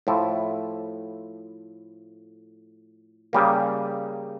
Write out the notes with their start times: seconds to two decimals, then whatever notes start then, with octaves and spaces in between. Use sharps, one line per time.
0.07 A2 F3 A3 E4
3.33 C#3 G3 A#3